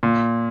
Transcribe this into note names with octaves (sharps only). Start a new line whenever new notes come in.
A#2